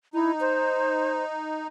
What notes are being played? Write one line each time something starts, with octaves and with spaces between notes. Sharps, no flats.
D#4 E4
C5